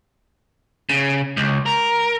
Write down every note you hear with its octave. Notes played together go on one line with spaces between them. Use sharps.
C#3
C#2
A#4